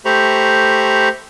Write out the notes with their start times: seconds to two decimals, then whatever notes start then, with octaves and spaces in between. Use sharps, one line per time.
0.05 A3 G4 C5 A#5 B5 C#6